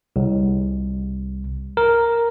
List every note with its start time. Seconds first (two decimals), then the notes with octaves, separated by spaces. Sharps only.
0.16 C2
1.77 A#4